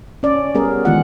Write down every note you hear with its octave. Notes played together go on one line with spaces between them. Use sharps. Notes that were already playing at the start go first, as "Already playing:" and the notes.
C#4 D5
G3 B3 C#4 G#4 A#4
D#3 E3 G#3 B3 F4 F#5